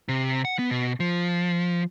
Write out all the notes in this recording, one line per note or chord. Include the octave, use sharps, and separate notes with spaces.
C3
F#5
B3
B2
F3